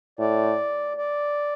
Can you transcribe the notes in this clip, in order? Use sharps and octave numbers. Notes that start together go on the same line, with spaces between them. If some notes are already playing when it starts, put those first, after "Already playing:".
A2 D5
D5